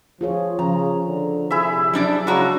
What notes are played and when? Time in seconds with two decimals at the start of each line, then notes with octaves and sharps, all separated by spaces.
0.21 F3 F4 G#4 C#5
0.59 C#3 F3 A#5
1.06 D3
1.51 C3 E4 G#4 E5
1.93 F#3 G3 D4 D5
2.27 C#3 G#3 D4 E4 F#4 A#5